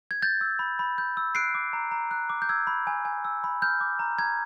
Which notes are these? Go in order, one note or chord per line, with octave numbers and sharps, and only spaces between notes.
G#6
G6 A6
E6
B5
B5
G6
E6
F#6 C7 D7
D6
A#5
A#5
F#6
D6
G6
E6 G#6
B5
G#5
G#5
E6
B5
F6 G6
D6
A#5
A#5 G#6